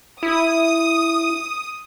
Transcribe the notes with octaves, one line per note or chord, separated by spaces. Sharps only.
E4 D#6